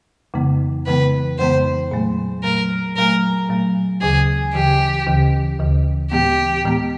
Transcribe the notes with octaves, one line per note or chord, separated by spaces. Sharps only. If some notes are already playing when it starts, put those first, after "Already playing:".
F2 C#3 E3 G#3 B3
F2 C#3 E3 G#3 B3 B4
F2 C#3 E3 G#3 B3 C5
A#2 F#3 A3
A#2 F#3 A3 A#4
A#2 F#3 A3 A#4
A#2 F#3 A3
D2 C#3 E3 G#4
D2 C#3 E3 G4
D2 C#3 E3
D2 C#3 E3
A2 E3 G#3 B3 G4
A2 E3 G#3 B3